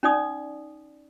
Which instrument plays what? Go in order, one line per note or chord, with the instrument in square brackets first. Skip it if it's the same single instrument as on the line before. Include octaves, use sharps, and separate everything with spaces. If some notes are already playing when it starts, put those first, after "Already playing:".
[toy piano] C#4 D#4 D5 D#6